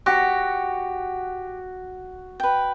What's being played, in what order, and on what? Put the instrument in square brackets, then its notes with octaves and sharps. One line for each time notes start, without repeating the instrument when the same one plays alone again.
[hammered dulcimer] F#4 [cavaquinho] G4
[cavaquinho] B4 G5